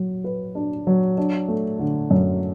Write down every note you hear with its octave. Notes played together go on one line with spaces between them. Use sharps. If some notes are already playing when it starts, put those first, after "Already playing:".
Already playing: F#3
B4
D4
F#3
D4
A3
D3
F#2